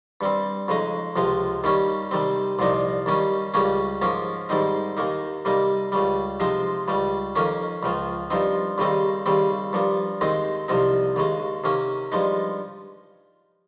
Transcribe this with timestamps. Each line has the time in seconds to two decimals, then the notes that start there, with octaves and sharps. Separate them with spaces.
0.21 G2 G3 C4
0.68 F2 C#3 G#3 D#4
1.16 C#2 C3 F3 G#3
1.64 D#2 D#3 G3 C#4
2.11 C3 D#3 G3 C4
2.59 C2 A#2 F3 A#3 D#4
3.06 D#2 D#3 G3 C#4
3.54 C#2 C#3 G3 A#3 C#4
4.02 G#2 F3 A#3 C#4
4.49 G#2 D#3 G3 C4 D#4
4.97 D#2 D#3 A#3 D#4
5.45 C3 G3 A#3 D#4
5.92 C#2 C#3 G3
6.40 C3 F3 G#3 C4 D#4
6.88 C#2 C#3 G3
7.36 F2 D#3 A#3 C#4
7.83 C#2 C#3 F3
8.30 G2 F3 C4 D#4
8.78 D#2 C#3 G3 C4 D#4
9.26 D#2 C#3 G3 C4
9.73 G2 F3 A#3
10.21 D#2 D#3 G#3 C4 D#4
10.68 C2 C3 F3 C4 D#4
11.16 D#2 C#3 G#3
11.64 C3 D#3 A#3 C#4
12.12 G2 F3 G#3 D#4